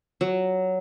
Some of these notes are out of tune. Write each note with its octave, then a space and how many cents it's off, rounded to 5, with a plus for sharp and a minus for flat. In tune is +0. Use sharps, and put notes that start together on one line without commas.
F#3 +5